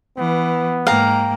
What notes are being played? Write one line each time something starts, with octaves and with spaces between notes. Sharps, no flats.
E3 B3
G#2 A#3 F5 G5 A#5